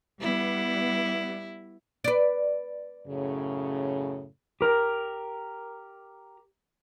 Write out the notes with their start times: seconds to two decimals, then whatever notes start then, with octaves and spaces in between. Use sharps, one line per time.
0.21 G3 B3 E4
2.04 B4 D5
3.07 F#2 A2 C#3
4.61 G4 A#4